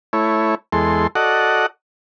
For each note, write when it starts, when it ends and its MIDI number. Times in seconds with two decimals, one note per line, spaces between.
0.13 0.55 57
0.13 0.55 64
0.13 0.55 73
0.72 1.07 40
0.72 1.07 56
0.72 1.07 69
0.72 1.07 84
1.15 1.66 66
1.15 1.66 69
1.15 1.66 74
1.15 1.66 75
1.15 1.66 78